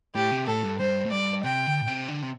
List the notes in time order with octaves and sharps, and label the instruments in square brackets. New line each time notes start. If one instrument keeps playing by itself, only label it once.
[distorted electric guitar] A2 [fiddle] G4
[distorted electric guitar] C3
[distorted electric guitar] A2 [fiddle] A4
[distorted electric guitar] G2
[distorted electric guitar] G2 [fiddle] C5
[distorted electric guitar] A2
[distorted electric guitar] G2 [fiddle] D5
[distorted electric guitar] C3 [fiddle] G5
[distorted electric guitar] D3
A2
C3
D3
C3